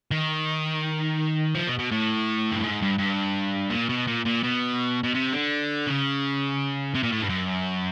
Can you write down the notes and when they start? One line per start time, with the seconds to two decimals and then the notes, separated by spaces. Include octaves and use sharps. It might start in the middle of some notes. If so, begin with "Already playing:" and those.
0.11 D#3
1.55 F3
1.67 B2
1.79 B2
1.92 A2
2.51 G2
2.62 G#2
2.82 G2
2.98 G2
3.70 A#2
3.89 B2
4.07 A#2
4.25 A#2
4.43 B2
5.03 B2
5.14 C3
5.32 D3
5.87 C#3
6.94 C3
7.03 A#2
7.12 A2
7.22 G2
7.29 F#2